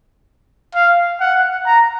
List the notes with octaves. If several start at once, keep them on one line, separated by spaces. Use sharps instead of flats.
F5
F#5
A#5